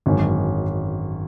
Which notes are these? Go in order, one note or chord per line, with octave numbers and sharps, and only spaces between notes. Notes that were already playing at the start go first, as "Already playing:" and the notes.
G#1 F#2 D3 G#3 C#4